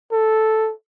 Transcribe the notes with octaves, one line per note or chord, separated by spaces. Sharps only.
A4